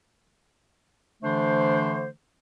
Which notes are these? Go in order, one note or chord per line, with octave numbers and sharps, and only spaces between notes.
D3 E3 A3 D4 C5